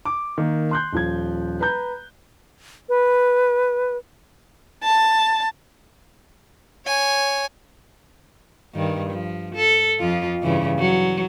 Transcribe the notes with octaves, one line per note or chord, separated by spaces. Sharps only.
D6
D#3 A#3
C6 F#6 G6
D#1 F3 G#6
B4 A#5 G6
B4
A5
C#5 G#5
G2 D#3
F3
A4
F2 F3 F4
G2 C#3 E3
F#3